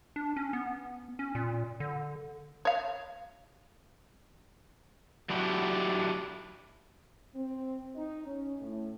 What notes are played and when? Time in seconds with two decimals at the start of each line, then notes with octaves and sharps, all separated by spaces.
0.16 D4
0.36 C#4
0.53 B3
1.19 C#4
1.35 A#2
1.80 D3
2.65 C#5 F5
5.30 F#3 D4 E4 F#4 G4
7.35 C4
7.95 D#4
8.26 C#4
8.61 A2